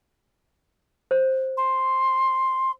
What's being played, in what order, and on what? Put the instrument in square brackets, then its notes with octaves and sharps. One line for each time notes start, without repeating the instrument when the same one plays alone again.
[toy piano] C5
[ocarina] C6